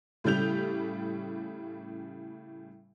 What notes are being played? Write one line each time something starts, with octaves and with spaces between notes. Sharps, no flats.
A2 C#3 G3 G6 F7